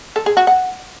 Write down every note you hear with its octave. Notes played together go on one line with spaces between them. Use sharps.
A4
G#4
F#4
F#5